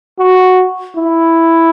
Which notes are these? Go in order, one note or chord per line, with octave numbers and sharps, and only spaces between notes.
F#4
E4